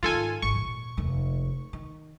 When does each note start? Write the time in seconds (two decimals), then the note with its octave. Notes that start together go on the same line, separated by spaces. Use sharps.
0.03 G#2 D#3 F4 A4 G#5
0.42 G#1 C#6
0.54 D#2 A#2
0.97 F1 D#2
1.73 D#3